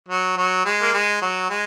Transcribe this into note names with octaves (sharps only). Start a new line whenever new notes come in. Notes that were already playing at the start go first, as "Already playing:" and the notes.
F#3
F#3
G#3
A#3
G#3
F#3
G#3